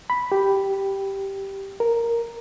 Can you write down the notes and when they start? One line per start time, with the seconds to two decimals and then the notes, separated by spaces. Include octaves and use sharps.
0.10 B5
0.32 G4
1.80 A#4